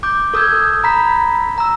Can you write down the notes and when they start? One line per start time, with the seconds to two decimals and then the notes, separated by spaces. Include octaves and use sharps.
0.03 D6 G6
0.34 A4 D#6 E6 G6 G#6
0.84 A#5 B5 B6
1.58 A#5 E6